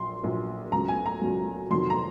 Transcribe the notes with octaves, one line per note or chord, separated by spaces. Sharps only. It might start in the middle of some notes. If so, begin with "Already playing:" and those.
Already playing: A#1 A#2 F#3 C6
A#1 A#2 F#3
C#2 C#3 F#3 A#5
G#5
A#5
C#2 C#3 F#3
F2 C3 D#3 F#3 C6
A#5